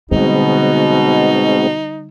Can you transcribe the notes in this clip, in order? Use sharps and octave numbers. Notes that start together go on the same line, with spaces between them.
B2 D3 G3 G#3 C4 D#4